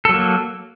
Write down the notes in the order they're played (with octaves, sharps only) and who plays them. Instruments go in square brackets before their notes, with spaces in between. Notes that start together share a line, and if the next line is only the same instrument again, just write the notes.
[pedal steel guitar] A4
F#3
A#3